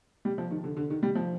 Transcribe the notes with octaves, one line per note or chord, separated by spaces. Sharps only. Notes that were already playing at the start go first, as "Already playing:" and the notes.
G3
F3
D#3
D3
D3
D#3
G3
F3